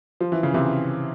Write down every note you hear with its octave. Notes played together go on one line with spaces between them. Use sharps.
F3
E3
C#3
C3 E3